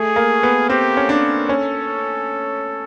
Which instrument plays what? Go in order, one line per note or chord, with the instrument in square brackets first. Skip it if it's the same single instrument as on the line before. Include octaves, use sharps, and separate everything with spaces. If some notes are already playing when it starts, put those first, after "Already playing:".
Already playing: [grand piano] A3 [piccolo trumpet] G#4
[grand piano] A#3
B3
[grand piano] C4 [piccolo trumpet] G4
[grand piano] C#4
D4
[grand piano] C#4 [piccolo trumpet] A4